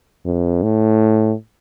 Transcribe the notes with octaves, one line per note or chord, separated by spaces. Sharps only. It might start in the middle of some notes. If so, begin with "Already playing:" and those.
F2
A2